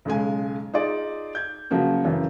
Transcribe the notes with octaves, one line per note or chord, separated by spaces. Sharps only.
B1 C#3 G#3 G#5
D#4 F4 G#4 D5
G6 G#6
C#3 F3 F#3 A#3 F#4
F#2 C#3 E3